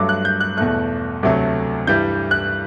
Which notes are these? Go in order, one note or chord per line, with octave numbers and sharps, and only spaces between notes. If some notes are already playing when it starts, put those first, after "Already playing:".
Already playing: G2 F#3 A3 D6
F#6
G6
F#6
E2 B2 A3 F#6
D2 C3 F#3 A3
G2 E3 G3 G6
F#6